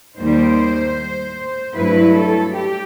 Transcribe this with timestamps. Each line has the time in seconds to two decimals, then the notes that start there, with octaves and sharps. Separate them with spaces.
0.17 D#2 D#3 G3 C5
1.75 G2 F#3 A3 E4 B4
2.15 A4
2.55 G4